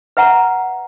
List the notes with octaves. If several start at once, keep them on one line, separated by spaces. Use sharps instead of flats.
B4 E5 F#5 A#5